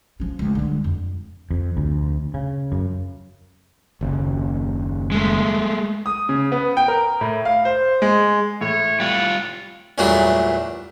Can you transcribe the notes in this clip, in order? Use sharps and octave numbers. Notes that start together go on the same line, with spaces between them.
F3 C#4
C#2 A3
D3 G3
F2
F2
D2
C#3
F#2
F#1 D#2 C#3
G#3 A3
D#6
C#3
B3
G5
A#4
A2
F5
C5
G#3
A2 C#5
G3 F4 F#5
E2 G2 A#2 F#3 A3 D4